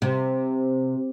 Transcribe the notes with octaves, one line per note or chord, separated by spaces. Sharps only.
C3